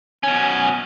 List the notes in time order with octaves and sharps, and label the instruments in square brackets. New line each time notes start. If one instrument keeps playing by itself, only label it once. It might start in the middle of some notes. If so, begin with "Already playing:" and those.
[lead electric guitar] B2 C#4 [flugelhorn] G#5